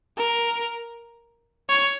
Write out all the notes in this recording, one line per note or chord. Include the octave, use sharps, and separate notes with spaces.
A#4
C#5